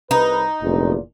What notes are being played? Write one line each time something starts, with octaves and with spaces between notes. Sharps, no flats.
C2 D#4 B4
F1 A#1 E2 A#2